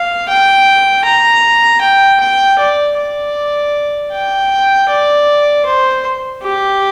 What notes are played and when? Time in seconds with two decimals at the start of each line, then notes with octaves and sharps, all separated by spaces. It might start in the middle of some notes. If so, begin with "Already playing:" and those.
Already playing: F5
0.28 G5
1.04 A#5
1.81 G5
2.20 G5
2.59 D5
2.97 D5
4.12 G5
4.89 D5
5.66 C5
6.43 G4